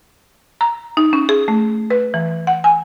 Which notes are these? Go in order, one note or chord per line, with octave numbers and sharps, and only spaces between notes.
A#5
D#4
C#4
G#4
A3
B4
E3
F#5
G#5